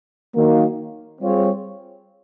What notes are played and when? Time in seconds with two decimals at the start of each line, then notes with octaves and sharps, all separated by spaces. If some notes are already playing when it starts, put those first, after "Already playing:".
0.34 D#3 F#3 A#3
1.20 G3 C4 F4 G#4 C#5